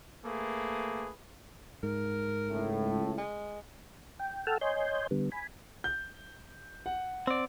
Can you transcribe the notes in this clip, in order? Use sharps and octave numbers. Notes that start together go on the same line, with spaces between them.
A3 A#3 G#4 B4
G#2 A#4
C#2 A2
G#3
G5
A4 F#5 G5 A5 E6 F6
C#5 D#5 G#5 C6 G6
D3 G3 B3
G#5 B5
G6
F#5
C4 D5